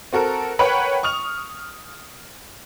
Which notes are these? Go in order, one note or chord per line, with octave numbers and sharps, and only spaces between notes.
C4 F#4 A4 A#4
A#4 B4 C#5 F#5 G5 B5
C#6 D#6 F6 F7